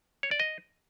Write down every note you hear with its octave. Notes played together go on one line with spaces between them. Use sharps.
C#5
D5
D#5